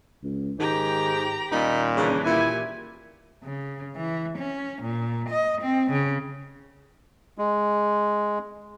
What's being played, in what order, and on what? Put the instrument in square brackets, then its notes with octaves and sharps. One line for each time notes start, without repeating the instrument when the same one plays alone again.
[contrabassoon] C#2
[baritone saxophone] G#2 [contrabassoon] D#3 [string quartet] G4 G5 A#5
[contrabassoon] D#1 [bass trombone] A#2 [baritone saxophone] D#4 [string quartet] B5
[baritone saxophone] C#3 [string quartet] E3 D4 D#4
[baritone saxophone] A#2 [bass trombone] E4 [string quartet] G4 G#5
[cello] C#3
E3
C#4
A#2
D#5
C4
C#3
[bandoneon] G#3